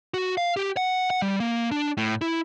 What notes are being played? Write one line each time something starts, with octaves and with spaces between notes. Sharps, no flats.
F#4
F5
G4
F#5
F#5
G3
A#3
D4
A2
E4